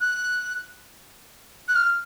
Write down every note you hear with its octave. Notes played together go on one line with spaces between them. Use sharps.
F#6
F#6
F6